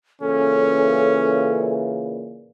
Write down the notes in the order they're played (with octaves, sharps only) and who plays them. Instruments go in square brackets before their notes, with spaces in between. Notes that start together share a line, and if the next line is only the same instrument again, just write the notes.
[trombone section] A#2 C#3 E3 [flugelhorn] C#4 [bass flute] A4